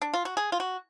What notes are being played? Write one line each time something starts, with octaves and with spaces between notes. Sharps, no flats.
D4
F4
F#4
G#4
F4
F#4